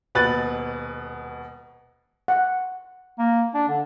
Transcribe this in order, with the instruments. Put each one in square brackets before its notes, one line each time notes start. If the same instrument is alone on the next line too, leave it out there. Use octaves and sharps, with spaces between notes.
[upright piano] D#1 B2 B4 F#6 A6 F#7
[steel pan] F#5
[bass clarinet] A#3
D4
D3